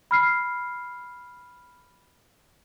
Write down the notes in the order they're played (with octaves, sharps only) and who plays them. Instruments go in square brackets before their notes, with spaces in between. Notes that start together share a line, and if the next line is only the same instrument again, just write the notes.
[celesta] B5 F6 C7